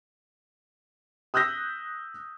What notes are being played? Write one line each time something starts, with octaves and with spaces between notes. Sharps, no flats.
D#6 E6 F#6 G6 A#6 B6